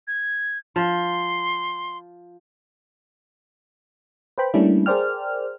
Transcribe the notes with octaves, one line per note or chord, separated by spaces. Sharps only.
G#6
F3 C6
B4 C5 G5 B5
G3 A3 A#3 C#4 D4 E4
G#4 A#4 C5 D5 G5 F6